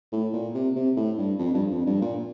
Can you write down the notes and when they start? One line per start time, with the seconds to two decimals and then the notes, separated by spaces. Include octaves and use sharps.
0.12 A2
0.33 A#2
0.54 C3
0.76 C3
0.97 A2
1.18 G2
1.39 F2
1.54 G2
1.71 F2
1.86 G2
2.01 A#2